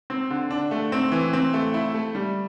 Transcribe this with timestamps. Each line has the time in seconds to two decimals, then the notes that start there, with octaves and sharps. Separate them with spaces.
0.10 C4
0.30 D3
0.51 D4
0.71 A3
0.92 C4
1.12 E3
1.33 C4
1.54 A3
1.74 E4
1.94 A3
2.15 G3